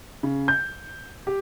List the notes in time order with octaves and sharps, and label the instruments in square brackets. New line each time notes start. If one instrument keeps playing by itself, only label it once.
[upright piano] C#3
G6
G4